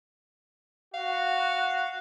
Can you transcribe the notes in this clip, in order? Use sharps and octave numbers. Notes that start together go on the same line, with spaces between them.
F#4 F5